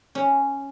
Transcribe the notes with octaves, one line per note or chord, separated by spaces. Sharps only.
C#4